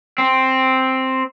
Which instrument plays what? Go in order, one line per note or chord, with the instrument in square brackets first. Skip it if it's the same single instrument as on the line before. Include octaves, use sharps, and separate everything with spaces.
[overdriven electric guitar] C4